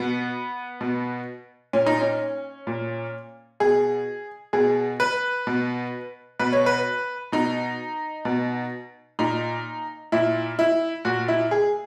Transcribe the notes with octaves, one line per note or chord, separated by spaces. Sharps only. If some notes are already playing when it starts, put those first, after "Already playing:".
Already playing: B2 B3
B2
A#2 C#4
D#4
C#4
A#2
B2 G#4
B2 G#4
B4
B2
B2 B4
C#5
B4
B2 D#4
B2
A#2 D#4
A#2 E4
E4
A#2 F#4
E4
G#4